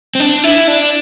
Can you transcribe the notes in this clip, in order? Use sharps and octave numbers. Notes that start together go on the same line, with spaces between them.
C4
D4
E4
D4